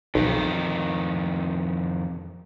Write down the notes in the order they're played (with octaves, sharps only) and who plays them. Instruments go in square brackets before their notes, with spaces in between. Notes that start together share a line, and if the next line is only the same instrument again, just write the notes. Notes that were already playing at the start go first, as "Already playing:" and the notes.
[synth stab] B1 [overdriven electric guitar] F2 D#3